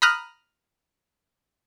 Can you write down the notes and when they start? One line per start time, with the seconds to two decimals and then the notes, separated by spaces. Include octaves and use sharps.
0.02 A#5 B5 D#6 F6 F#6